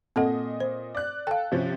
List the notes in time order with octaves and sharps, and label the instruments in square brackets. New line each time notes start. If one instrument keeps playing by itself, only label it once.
[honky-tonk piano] A#2 D#5 [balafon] C4 A4 F#5
[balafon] C5
[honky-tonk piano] D5 F#6
[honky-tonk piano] A4 [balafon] F5 G5
[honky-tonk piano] C3 F3 C#4